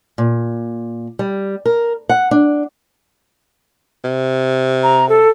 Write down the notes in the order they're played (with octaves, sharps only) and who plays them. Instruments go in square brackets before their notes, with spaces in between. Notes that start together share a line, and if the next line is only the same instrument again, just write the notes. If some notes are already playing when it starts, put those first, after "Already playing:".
[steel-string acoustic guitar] A#2
G3
A#4
F#5
D4
[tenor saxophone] C3
[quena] A#5
A4